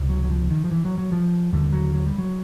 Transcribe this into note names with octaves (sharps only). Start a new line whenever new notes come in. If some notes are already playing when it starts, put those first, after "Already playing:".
Already playing: C#2 C3
F#3
F#3
F3
D#3
F3
E3
F#3
F#3
F3
D#2 D3 G3
F#3
F#3
G3
F#3